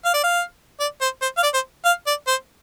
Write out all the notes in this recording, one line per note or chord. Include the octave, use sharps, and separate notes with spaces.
F5
D5
F5
D5
C5
C5
F5
D5
C5
F5
D5
C5